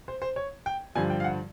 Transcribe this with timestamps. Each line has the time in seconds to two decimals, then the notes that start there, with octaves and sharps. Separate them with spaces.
0.08 C5
0.22 C5
0.36 C#5
0.66 G5
0.95 G2 D3 F3 G#5
1.10 G5
1.20 F5
1.24 F#5